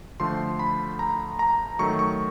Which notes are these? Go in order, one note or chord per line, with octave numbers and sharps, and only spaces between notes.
D3 F3 A3 C6
B5
A#5
A#5
D#3 F#3 A3 C#6
C#6